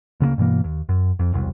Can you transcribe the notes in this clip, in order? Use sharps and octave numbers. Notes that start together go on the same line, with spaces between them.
D2 C#3 F#3 A#3
G2 B2 E3 A#3
D#2
F#2
F2
E1 C2